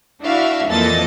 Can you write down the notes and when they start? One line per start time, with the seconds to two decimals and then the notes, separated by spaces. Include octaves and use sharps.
0.22 D4 E4 F#4 E5 F5
0.67 F2 A#2 E3 A4 D#5 A6